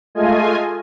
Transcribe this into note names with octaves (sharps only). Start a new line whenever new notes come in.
G#3 A3 F4 D#5 G#5